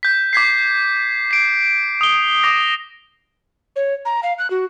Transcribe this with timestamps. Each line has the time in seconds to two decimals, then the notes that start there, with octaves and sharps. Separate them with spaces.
0.03 G6 B6
0.33 D6 G#6 B6 C7
1.31 C7 D7
2.01 D#6 G7
2.43 D6 D#6 A#6
3.76 C#5
4.05 A#5
4.23 F5
4.38 F#6
4.50 F#4